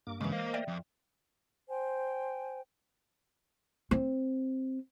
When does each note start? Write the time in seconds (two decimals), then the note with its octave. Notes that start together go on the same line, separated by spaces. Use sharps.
0.07 G2 A#3 D6
0.21 C#3 E3 G#3
0.32 A#3 A#4 C5 D#5 F5
0.54 D5 E5 G5
0.68 F2
1.68 C5 G5 G#5
3.91 C4